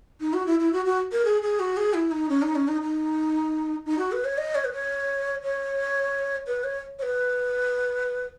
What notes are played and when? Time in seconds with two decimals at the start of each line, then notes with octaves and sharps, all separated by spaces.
0.20 D#4
0.33 F#4
0.46 E4
0.59 E4
0.73 F#4
0.85 F#4
1.12 A#4
1.25 G#4
1.42 G#4
1.60 F#4
1.77 G#4
1.94 E4
2.11 D#4
2.29 C#4
2.42 D#4
2.55 C#4
2.68 D#4
2.82 D#4
3.86 D#4
3.98 F#4
4.12 B4
4.25 C#5
4.38 D#5
4.55 C#5
4.65 B4
4.73 C#5
5.42 C#5
6.47 B4
6.64 C#5
6.99 C#5
7.03 B4